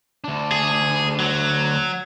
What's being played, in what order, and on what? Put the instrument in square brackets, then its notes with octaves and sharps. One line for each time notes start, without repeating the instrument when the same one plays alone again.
[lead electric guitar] D2 D4
[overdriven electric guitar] G#4
F#3